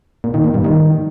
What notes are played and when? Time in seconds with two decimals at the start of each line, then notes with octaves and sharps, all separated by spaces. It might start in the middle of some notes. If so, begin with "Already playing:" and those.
0.24 A#2
0.34 D#3
0.44 A#2
0.54 G2
0.64 D#3